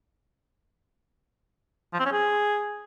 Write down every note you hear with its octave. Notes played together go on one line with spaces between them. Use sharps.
F3
C4
C#4
G#4